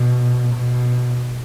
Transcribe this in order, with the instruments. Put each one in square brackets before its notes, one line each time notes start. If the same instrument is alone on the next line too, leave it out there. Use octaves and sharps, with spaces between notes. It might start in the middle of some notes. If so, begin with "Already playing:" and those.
Already playing: [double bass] B2
B2